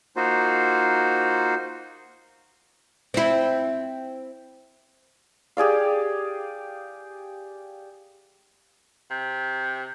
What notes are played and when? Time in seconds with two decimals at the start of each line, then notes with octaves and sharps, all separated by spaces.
0.16 A#3 D#4 F4 F#4 C5
3.14 C4 E4
5.57 G4 G#4 D5 F5
9.11 C3